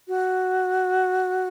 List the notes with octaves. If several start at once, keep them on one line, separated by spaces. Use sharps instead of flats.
F#4